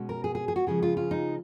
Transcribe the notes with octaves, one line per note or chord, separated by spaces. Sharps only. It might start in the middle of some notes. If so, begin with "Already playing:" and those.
Already playing: B2 G#3 C#4
A#4
G#4
G#4
G#4
F#4
C#3 F3 G#3 C#4 G#4
F4
F4
D#4